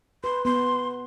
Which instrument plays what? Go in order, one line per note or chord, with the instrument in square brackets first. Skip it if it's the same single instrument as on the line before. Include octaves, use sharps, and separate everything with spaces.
[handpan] B4 [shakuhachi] C6
[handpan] B3 [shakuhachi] C6